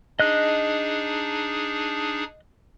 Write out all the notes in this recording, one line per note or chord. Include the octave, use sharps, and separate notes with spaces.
D4 D#4 G#4 D#5 F#6